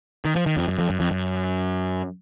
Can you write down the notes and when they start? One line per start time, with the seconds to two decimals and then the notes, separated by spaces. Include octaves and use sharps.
0.25 D#3
0.36 F3
0.46 D#3
0.57 F2
0.68 F#2
0.79 F2
0.90 F#2
1.00 F2
1.11 F#2